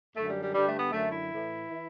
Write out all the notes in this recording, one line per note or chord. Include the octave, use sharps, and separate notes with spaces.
F#2 D3 A3
G3
G3
G2 D3 G3
A3
B3
F#2 D3 A3
E4
A2 E3
E3